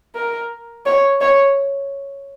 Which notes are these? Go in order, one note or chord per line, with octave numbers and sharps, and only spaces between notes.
A#4
C#5
C#5